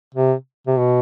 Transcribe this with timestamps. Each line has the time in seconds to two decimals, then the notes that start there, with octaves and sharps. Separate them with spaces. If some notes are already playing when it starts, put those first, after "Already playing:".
0.14 C3
0.67 C3
0.78 B2